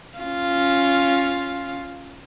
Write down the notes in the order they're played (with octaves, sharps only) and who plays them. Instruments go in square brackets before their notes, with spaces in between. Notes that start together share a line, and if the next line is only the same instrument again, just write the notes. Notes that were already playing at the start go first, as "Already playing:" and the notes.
[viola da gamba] C#4 F4